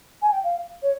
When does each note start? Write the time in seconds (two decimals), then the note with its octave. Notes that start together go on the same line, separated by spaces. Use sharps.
0.21 G#5
0.31 G5
0.43 F5
0.82 C#5